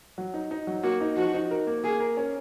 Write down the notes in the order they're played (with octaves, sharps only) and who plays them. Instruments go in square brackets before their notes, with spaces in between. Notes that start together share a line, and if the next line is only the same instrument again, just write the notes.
[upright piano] F#3
D#4
D#4
F#3
[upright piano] A#3 [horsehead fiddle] F#4
[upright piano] D#4
[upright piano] F3 [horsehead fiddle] F#4
[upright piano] D#4
A#4
A#3
[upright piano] A#3 [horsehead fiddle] G#4
[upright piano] A#4
C#4